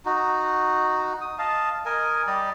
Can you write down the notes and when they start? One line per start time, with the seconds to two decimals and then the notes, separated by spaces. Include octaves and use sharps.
0.05 D#4 F#4
1.21 D#6
1.39 D#5 F5 A5
1.85 A#4 D#5 G#5
2.27 G3 G4 D5 D#5